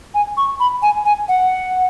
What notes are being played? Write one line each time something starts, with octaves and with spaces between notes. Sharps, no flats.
G#5
C#6
B5
G#5
G#5
F#5